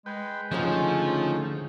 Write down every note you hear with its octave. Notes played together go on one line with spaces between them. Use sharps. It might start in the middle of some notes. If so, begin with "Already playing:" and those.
G#3 B4 G5
D2 G#2 C#3 F3 G#3 A3 C#4 D#4